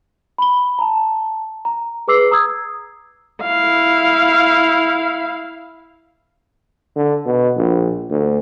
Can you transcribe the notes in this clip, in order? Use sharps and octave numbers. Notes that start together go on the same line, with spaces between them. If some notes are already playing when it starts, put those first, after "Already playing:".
B5 G7
A5 A#5
A#5
G#4 B4 D6 E6 C7
A#5 D#6 E6 G#6
E4 F5
D3
B2
A#1
D2